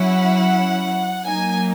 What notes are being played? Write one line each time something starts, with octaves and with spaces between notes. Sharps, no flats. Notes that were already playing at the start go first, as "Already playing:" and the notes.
Already playing: F#3 C#4 E4 F#5
F#3 A#3 D#4 G#5